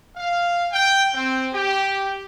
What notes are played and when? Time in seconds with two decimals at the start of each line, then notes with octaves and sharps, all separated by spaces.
0.16 F5
0.72 G5
1.14 C4
1.53 G4